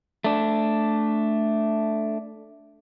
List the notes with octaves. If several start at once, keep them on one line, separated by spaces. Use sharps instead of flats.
A3 D4